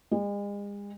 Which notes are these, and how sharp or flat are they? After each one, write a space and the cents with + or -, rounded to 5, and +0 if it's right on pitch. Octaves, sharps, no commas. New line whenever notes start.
G#3 -40